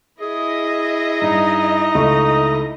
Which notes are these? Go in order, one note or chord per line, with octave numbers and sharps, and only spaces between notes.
E4 G#4 D#5
G2 D#4
C#2 A3 C#6